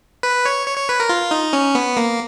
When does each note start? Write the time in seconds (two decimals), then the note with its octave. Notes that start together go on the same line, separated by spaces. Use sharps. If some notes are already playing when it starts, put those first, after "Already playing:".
0.23 B4
0.45 C#5
0.67 C#5
0.77 C#5
0.89 B4
1.00 A#4
1.09 F4
1.31 D#4
1.53 C#4
1.75 B3
1.97 A#3